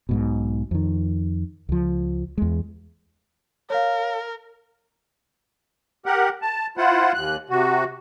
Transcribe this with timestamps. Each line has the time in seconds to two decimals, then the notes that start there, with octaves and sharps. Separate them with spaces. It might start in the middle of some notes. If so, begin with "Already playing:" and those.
0.09 B1 G#2 B2
0.71 F2 D#3
1.69 C#2 F3
2.38 E2 G#3
3.70 A#4 C#5 F5
6.06 G4 A#4 F#5
6.42 A5
6.77 E4 F4 C5 F#5
7.14 D#2 F#6
7.50 C3 F#4